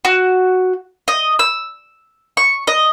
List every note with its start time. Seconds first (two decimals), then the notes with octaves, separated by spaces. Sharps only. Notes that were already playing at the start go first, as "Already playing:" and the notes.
0.05 F#4
1.08 D#5
1.39 E6
2.37 C#6
2.67 D#5